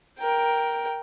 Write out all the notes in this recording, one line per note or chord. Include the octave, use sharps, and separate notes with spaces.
A#4 G5